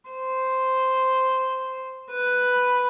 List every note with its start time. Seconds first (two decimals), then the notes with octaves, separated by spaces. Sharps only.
0.10 C5
2.11 B4 B5